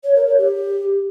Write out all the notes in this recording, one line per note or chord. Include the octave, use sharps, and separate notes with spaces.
C#5
A#4
C#5
G4